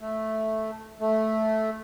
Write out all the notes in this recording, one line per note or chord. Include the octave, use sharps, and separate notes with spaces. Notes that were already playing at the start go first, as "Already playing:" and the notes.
A3
A3